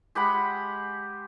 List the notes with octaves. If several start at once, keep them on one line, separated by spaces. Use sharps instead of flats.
G#3 G4 F#5 B5